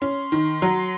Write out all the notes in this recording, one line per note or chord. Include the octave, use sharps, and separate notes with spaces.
C#4 C6
D#3
F#3